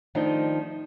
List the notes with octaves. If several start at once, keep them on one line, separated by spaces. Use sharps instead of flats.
D#3 F3 A3 D4 D#4